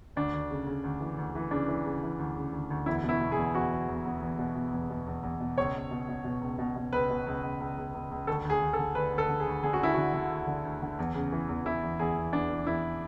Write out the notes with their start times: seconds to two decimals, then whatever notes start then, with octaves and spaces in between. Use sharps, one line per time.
0.16 D2 D4
0.34 D2
0.50 C#3
0.66 C#3
0.84 D2
1.01 E3
1.18 D2
1.35 E3
1.51 C#3 D4
1.68 E3
1.85 C#3
2.03 E3
2.19 D2
2.36 C#3
2.53 D2
2.70 D2
2.86 E2 E4
3.03 B2
3.09 E4
3.20 B2
3.32 G#4
3.37 E2
3.54 E2 F#4
3.71 E2
3.88 E2
4.05 E2
4.22 E2
4.39 B2
4.55 B2
4.73 E2
4.90 B2
5.07 E2
5.23 E2
5.40 B2
5.58 C#2 C#5
5.74 C#2
5.91 B2
6.09 B2
6.25 B2
6.41 C#2
6.59 B2
6.76 B2
6.93 C#2 B4
7.10 B2
7.26 C#2
7.43 C#2
7.60 C#2
7.78 C#2
7.94 C#2
8.11 C#2
8.27 D2 A4
8.45 D2
8.50 G#4
8.62 D2
8.73 A4
8.79 D3
8.95 D2 B4
9.13 D2
9.18 A4
9.29 D3
9.40 G#4
9.46 D2
9.63 D3 G#4
9.73 F#4
9.80 D2 E4
9.94 D3 F#4
10.13 D3
10.31 D2
10.47 D3
10.65 D2
10.82 D3
10.99 E2
11.15 C#3
11.32 E3
11.49 E2
11.65 E3 E4
11.82 E2
11.99 E2 G#4
12.17 E2
12.33 E2 D4
12.50 E3
12.67 E2 E4